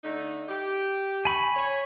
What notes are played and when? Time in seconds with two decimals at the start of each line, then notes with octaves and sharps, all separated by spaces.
0.03 D3 A3 D#4
0.49 G4
1.25 G#5 B5 C#6
1.55 C#5